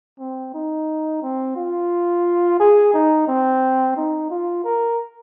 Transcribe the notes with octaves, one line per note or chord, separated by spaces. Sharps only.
C4
D#4
C4
F4
G#4
D#4
C4
D#4
F4
A#4